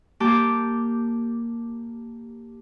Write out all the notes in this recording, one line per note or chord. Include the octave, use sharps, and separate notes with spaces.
A#3 G4 A5 D6 G6